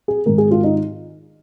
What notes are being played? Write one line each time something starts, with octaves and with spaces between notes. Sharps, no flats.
G#4
G#2 D#3 A#4
G#4
F4
D#4